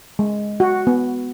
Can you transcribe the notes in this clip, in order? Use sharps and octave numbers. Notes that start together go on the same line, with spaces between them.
G#3
F#4
B3